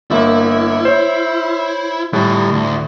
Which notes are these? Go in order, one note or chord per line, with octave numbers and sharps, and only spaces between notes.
G1 A#3 E4
C5 C#5
A2 G3 A4
D2